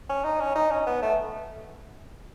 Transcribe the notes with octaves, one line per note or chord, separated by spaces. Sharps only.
C#4
D#4
C#4
D#4
C#4
B3
A3